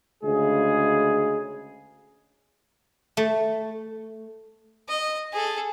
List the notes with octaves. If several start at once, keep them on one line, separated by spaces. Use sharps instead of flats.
D2 C#3 G#3 G#4
A3
D#5
G#4 A4